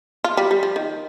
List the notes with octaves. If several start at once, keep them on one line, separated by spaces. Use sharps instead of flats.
F4
G3
G3
F3
D#3